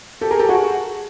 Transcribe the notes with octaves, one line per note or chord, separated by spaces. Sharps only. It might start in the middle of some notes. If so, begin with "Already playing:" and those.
G4 A4
G#4 A#4
G4 A4
F#4 G#4